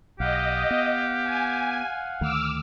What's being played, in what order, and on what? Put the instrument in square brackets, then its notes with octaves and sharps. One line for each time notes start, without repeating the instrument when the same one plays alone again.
[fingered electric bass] B1 [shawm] G4 [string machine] D#5 [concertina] F5 F#5
[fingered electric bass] B3
[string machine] G#5
[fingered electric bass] D2 D#3 A3 [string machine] D6 E6 F6